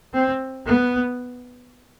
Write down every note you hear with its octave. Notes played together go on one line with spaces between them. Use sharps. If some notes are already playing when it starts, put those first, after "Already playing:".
C4
B3